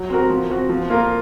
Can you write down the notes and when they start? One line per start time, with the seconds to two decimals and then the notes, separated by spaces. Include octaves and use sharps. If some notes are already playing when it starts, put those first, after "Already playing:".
Already playing: F#3
0.10 C4 F#4 A#4
0.30 F3
0.50 C4 F#4
0.69 F3
0.90 A#3 F4 A#4